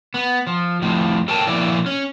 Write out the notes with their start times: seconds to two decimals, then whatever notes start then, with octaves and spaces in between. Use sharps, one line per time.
0.14 B3
0.47 F3
0.82 F2 A2 F3
1.28 A4 A#4 G5 A5
1.47 A#2 F3 E4 D5
1.86 C#4